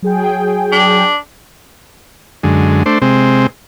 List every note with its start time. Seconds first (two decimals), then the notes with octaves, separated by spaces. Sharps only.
0.02 F#3 G#4 G5
0.72 D4
2.43 F#2 D3 G#3
2.86 A3 D4 C5
3.02 C3 G#3 C4